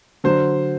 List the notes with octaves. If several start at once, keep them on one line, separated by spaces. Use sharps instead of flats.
D3 F#3 C5